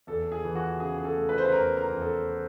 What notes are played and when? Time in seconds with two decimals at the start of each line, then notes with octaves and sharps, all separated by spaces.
0.07 E2 A4
0.32 G#4
0.44 E3
0.55 F#4
0.80 C#3 G#4
0.98 G#4
1.05 A4
1.17 A3
1.29 B4
1.38 C5
1.45 B4
1.52 E2 A#4
1.77 A#4
1.89 E2
2.01 A4